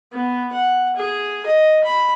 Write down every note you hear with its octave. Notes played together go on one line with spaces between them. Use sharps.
B3
F#5
G#4
D#5
B5